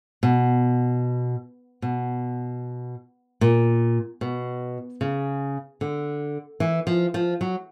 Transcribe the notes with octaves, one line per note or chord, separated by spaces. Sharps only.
B2
B2
A#2
B2
C#3
D3
E3
F3
F3
F#3